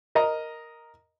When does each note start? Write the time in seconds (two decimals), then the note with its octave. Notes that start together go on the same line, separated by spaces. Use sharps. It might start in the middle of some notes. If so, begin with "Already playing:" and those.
0.15 A#4 D#5 A#5